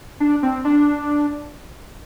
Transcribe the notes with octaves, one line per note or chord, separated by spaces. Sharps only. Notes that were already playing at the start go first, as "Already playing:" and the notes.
D4
C4
D4